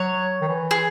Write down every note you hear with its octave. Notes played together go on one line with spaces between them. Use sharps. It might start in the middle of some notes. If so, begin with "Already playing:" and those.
Already playing: F#3 C#5
D#3
E3
G#4